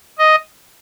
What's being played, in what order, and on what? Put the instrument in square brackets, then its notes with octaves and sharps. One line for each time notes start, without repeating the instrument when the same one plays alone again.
[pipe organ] D#5